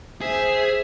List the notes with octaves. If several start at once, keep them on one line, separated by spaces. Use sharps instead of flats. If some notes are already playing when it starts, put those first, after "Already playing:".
G#4 C5 E5